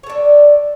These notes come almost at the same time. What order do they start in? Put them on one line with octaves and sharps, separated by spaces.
C#5 A4 D4